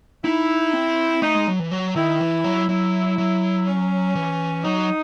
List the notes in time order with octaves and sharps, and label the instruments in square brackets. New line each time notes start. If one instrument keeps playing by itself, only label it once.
[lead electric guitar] D#4 [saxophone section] E4
[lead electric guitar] C4
[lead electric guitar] A3 [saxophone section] D#4
[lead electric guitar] G#3
F#3
E3
F#3
[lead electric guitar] D#3 [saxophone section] E4
[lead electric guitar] E3
F#3
[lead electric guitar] F#3 [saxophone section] E4
[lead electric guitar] F#3
[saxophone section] C#4
[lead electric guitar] E3
[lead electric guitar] F#3 [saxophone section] D#4